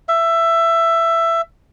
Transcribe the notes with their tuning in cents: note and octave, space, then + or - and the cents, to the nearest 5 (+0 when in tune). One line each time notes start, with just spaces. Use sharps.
E5 +15